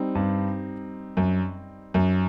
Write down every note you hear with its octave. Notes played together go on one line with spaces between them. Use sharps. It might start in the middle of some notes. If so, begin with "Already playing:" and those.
Already playing: G3 C4 D#4
G2
F#2
F#2